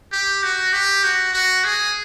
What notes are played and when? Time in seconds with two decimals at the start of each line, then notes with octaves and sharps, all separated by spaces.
0.12 G4
0.43 F#4
0.73 G4
1.04 F#4
1.33 F#4
1.64 G#4